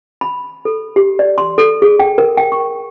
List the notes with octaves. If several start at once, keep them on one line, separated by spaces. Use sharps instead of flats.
B5
A4
G4
D5
C6
A4
G#4
G5
A#4
G5
C#6